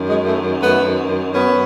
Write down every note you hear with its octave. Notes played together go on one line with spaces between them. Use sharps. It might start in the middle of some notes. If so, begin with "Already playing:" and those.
Already playing: F#2 D#3
G#3
A3
A3 B3
B3 C#4